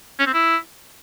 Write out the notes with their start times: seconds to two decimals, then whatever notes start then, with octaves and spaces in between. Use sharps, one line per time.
0.19 C#4
0.26 C4
0.34 E4